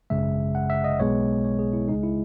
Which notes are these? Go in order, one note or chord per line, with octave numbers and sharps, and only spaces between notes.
G#1 F#2 C#3 G#3 E5
F#5
E5
D#5
B1 B2 G#3 B3 C#5
C#5
G#4
E4
C#2 C#3 G#3 D#4
E4